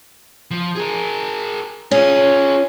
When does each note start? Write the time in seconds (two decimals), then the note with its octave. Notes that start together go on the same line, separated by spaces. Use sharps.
0.52 F3
0.75 G#4 A#4
1.91 C#4 F4 G#4